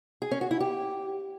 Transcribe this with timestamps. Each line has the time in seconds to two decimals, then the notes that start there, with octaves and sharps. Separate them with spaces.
0.22 G#4
0.31 C#4
0.41 F#4
0.51 E4
0.60 G4